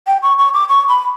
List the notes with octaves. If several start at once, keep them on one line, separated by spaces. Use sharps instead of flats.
G5
C#6
C#6
D6
C#6
B5